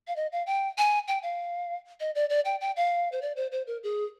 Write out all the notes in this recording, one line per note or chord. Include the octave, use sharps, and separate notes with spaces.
F5
D#5
F5
G5
G#5
G5
F5
D#5
D5
D5
G5
G5
F5
C5
D5
C5
C5
A#4
G#4